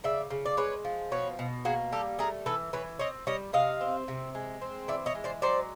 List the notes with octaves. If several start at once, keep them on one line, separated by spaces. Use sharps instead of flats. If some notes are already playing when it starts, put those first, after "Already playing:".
C#3 D5 E5
C#3
D5
G#3 B4 C#5
F3
B2 B4 C#5
B2
A#3 F#4 G#4
G3 G4 A4
A3 G#4 A#4
E3 A4 B4
E3 B4 C#5
C4 C#5 D#5
G3 C#5 D#5
C3 D#5 F5
C4
C3
G#3
C4
E3 D5 E5
C#5 D#5
G#3
C5 D5
F#3 C5 D5